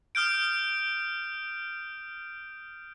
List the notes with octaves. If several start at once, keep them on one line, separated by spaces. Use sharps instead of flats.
D#6 F6 G6 D7